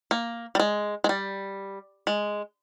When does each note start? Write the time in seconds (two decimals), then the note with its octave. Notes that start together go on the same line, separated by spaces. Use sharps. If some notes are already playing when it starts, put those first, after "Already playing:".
0.11 A#3
0.55 G3
0.60 G#3
1.04 G#3
1.09 G3
2.07 G#3